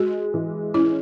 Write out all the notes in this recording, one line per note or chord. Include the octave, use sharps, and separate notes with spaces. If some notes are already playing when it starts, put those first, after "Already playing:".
Already playing: G#3 F#4
E3
C#4 E4